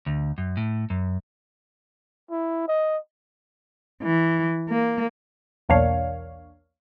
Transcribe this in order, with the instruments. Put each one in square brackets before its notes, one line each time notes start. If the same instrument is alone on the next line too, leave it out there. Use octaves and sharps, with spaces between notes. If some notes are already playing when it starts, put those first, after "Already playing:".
[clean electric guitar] D2
F#2
A2
F#2
[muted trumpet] E4
D#5
[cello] E3
A#3
[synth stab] B1 E2 A#3 D4 C#5 F5